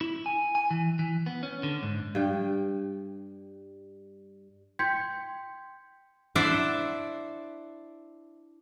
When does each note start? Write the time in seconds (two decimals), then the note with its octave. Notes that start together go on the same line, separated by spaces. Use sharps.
0.01 E4
0.26 G#5
0.55 G#5
0.71 E3
0.99 E3
1.26 B3
1.43 C#4
1.63 D3
1.83 G#2
2.15 G2 G5
4.79 G5 C6 G6 G#6 B6 C#7
6.35 D4 E4 C5 D5 E5 F#5